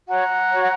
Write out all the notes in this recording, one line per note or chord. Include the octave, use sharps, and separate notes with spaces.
F#4 C#5 F#5 A#5
F#4 C#5